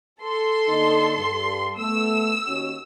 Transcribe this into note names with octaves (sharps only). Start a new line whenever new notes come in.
A4 C6
D3 A#3 D#4
G2
A3 B3 E6
D#2 C#4 F#4